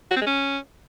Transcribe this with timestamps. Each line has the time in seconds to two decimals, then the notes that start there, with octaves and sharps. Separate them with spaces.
0.11 F#4
0.16 C4
0.21 G#3
0.27 C#4